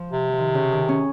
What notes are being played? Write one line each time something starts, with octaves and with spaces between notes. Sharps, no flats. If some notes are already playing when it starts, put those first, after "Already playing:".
Already playing: F3
C3
F3
D#3
C#3
D#3
C#4